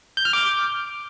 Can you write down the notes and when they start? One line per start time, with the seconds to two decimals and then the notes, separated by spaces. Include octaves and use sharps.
0.17 G6
0.25 F6
0.33 D6